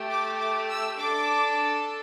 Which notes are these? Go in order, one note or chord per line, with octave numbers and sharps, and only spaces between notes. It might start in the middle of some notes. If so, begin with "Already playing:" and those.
Already playing: A3 G4
D6
D6
E6
D4 A4 D6